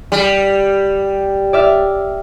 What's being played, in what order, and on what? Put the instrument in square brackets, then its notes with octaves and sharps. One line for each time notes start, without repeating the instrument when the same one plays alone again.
[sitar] G3
[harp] D5 E5 F6